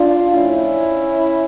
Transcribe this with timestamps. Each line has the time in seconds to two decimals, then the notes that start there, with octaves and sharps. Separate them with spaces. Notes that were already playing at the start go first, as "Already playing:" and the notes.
Already playing: D4 F4
0.35 A2 F3 C#4 E4